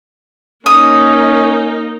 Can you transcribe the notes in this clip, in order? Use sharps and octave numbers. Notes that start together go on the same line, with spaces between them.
A#3 C#4 D#4 D#6